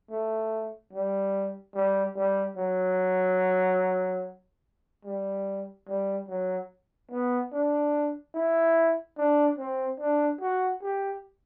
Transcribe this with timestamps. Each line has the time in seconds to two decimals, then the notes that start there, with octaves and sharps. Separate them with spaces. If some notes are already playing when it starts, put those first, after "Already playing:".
0.11 A3
0.93 G3
1.75 G3
2.16 G3
2.57 F#3
5.05 G3
5.88 G3
6.29 F#3
7.12 B3
7.52 D4
8.35 E4
9.18 D4
9.58 C4
10.00 D4
10.41 F#4
10.83 G4